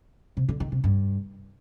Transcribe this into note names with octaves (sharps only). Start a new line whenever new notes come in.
C3
D3
D#3
C3
G2